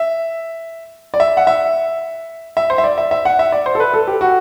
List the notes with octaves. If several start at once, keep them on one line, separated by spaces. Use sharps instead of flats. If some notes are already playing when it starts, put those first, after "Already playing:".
Already playing: E5
D5
E5
F#5
E5
E5
C5
E5
D5
E5
E5
F#5
E5
D5
C5
A4
B4
A4
G4
F#4